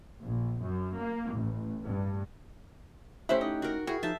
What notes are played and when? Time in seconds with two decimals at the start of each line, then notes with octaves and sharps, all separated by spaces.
0.22 A#1
0.63 F#2
1.00 A#3
1.32 A1
1.85 G2
3.29 A3 C#4 E4 G4 C5 E5 F#5
3.41 D#4 D#5
3.62 F#4 A#4
3.87 E4 F#4 G#4 G5
4.03 F3 D#4 E5 A5 G6